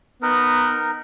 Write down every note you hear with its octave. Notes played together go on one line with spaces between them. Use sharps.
B3 D#4 A#4